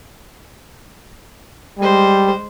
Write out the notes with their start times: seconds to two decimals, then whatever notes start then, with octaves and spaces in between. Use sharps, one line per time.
1.79 G3 G#3 C5